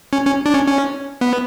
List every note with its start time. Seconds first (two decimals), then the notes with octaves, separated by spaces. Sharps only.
0.13 C#4
0.26 C#4
0.46 D4
0.54 C#4
0.67 C#4
1.21 B3